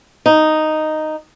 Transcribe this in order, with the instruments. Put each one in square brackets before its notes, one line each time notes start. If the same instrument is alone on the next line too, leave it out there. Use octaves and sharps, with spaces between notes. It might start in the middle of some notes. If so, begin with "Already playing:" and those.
[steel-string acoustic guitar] D#4